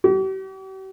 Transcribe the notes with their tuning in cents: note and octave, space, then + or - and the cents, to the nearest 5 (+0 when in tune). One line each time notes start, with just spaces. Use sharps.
G4 -45